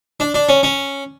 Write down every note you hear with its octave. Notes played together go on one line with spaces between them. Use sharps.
D4
D4
C#4
C#4